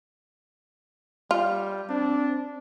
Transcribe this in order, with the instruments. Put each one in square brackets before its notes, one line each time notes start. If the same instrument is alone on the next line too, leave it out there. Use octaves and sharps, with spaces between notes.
[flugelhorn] G3 [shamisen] F4
[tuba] C4 [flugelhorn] D4